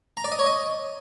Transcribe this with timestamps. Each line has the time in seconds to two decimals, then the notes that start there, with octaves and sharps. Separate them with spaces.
0.17 A#5
0.24 D5
0.32 D#5
0.39 C#5
0.46 D#5